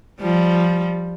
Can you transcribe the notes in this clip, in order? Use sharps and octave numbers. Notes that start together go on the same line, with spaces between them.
F3 G3